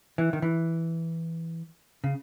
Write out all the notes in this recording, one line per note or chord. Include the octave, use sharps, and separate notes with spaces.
E3
D#3
E3
C#3